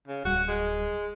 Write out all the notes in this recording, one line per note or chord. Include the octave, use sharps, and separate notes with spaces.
C#3
D1 G3 F#4
G#3